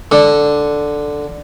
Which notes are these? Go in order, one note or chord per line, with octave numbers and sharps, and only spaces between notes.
D3